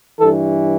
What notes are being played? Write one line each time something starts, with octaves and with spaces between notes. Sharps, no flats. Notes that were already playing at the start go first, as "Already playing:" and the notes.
G2 E3 A4